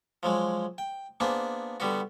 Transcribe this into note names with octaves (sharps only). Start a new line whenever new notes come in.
F3 F#3 G#3
G5
A#3 B3 D4 G#4 C5
D3 G3 B3 F#4